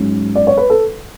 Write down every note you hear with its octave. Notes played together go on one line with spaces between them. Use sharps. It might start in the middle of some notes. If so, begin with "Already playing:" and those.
Already playing: G#2 F#3 C#4
D5
C#5
B4
A4